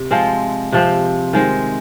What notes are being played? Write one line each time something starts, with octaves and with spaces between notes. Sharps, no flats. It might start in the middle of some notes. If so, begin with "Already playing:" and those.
Already playing: C3
F3 G#3 C4 F4
C3 F3 C4
D#3 G#3 C4